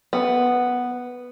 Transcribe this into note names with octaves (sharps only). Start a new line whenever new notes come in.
B3